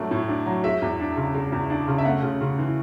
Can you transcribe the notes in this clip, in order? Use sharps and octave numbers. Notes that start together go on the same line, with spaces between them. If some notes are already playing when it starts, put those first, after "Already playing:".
Already playing: A2 F#3 A3 D4
A2
D4
F#3
G#3 E5
E2
D4
C#3
G#3
E2
D4
C#3
E5
A3 F#5
C#3
C#3
E3